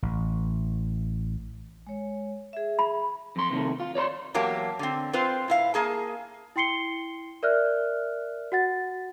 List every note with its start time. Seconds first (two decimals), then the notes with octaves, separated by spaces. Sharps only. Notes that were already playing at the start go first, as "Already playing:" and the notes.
0.03 A1
1.87 G#3 C#5
2.53 G#4 E5
2.79 B5
3.36 F2 C6
3.51 C3 D#3 A3
3.80 F4
3.95 C#5 D5 B5 C6
4.34 E2 F#3 A#3 G4 A5
4.79 D3 C4
5.13 C4 F4 B4 C5
5.48 A2 E4 F5
5.74 A#3 G#4 A5
6.56 E4 G5 C6 C7 C#7 G7
7.43 A#4 D5 E5 F6 F#6
8.52 F#4 F#5 A6